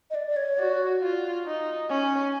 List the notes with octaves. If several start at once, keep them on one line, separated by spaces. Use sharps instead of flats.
D#5
D5
D5
C#5
F#4 D5
F4
D#4
C#4